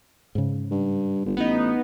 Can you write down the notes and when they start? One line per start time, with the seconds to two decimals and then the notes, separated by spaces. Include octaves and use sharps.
0.35 G#2 C#3
0.71 G2
1.26 G1
1.37 A1 B3 D#4